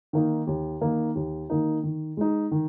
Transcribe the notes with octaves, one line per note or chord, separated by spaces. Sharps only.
D#3 A#3 D#4
D#2
D#3 A#3 D#4
D#2
D#3 A#3 D#4
D#3
G#3 D#4
D#3